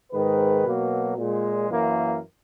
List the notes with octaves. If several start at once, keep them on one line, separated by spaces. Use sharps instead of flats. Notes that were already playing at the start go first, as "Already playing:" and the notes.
G#2 D#3 G#3 B4
B2 F#3 A#3
A#2 G#3
F#2 E3 A#3